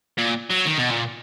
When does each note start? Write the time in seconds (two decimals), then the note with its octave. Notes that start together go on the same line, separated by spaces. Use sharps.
0.18 A#2
0.50 F#3
0.66 D#3
0.79 B2
0.91 A#2